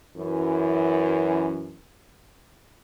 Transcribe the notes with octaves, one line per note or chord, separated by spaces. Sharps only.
F#2 E3